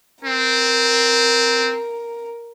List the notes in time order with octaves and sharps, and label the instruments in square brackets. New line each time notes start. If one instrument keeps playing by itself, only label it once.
[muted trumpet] C4 [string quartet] A#4